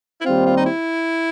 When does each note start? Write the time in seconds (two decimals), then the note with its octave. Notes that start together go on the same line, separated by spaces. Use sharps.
0.21 E4
0.25 D#2 D#3 G3 C4 F4
0.46 F4
0.57 D#4
0.66 E4